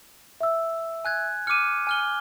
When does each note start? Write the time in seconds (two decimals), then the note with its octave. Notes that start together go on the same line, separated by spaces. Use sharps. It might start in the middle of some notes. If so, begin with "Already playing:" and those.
0.41 E5 E6
1.05 G#5 F#6 G#6
1.47 D6 F6 C#7 D#7
1.87 G#5 F6 G7